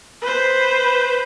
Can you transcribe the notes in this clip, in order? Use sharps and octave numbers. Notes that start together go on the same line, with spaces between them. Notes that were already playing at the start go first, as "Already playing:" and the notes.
B4 C5